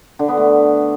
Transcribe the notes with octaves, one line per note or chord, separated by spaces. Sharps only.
D3
B3
A3